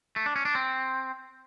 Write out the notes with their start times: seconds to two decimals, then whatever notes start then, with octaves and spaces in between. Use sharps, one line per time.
0.16 A3
0.26 D4
0.36 C#4
0.45 D4
0.55 C4